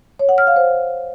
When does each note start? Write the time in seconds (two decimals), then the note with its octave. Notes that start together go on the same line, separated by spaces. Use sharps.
0.19 C#5
0.29 F#5
0.38 F6
0.47 F5
0.56 C5